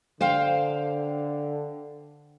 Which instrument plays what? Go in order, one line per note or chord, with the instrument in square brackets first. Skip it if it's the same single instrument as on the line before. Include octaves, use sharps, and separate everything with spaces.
[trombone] D3 [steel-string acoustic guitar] C5 F5 G5